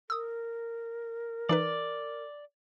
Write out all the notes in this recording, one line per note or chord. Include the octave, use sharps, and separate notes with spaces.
A#4 D#6 E6
E3 D#4 B4 D5